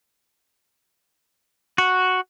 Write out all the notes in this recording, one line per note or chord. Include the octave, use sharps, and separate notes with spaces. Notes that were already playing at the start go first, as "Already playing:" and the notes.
F#4